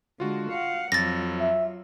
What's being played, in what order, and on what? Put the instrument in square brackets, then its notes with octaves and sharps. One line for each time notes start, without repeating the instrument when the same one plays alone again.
[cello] D3 G#3 [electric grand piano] F4 F#4
[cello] F5 F#5
[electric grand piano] F2 [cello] F#3 F4 [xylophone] A6 A#6
[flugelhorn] E5